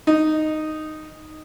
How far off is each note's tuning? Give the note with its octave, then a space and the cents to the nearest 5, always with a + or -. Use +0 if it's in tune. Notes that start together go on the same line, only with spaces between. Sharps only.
D#4 -5